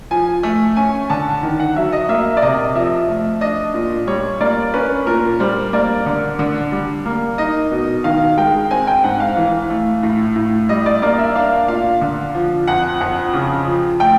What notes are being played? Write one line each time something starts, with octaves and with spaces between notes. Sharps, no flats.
F3 G#5
A3
C#4 G#5
D3 A5
D#3
F#5
F#3 E5
D#5
A#3 E5
D5
C3 D#5
F3 E5
A3
D4 D#5
A#2
G3 C#5
A#3 D5
C#4 B4
A#2 A#4
G3 C5
A#3 D5
D3
D3
G3
A#3
D#4 D#5
B2
D#3 F5
G#3 G5
C4 G#5
G5
G#2 F#5
F5
E3
A3
A2
A2
G3 D#5
D5
A#3 D5
E5
D4 F5
A#2 F5
D3
F3
F2 F#5
F2 F#5
C#3
F3
A3 G5